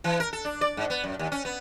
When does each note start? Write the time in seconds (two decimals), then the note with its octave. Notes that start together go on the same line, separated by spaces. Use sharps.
0.04 E3
0.20 A#4
0.33 A4
0.45 D4
0.61 D5
0.77 G#2
0.90 B3
1.04 F#2
1.19 D#2
1.32 C#4
1.45 B3